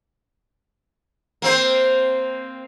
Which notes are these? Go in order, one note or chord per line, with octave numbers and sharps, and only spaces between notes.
A#3 C4 C5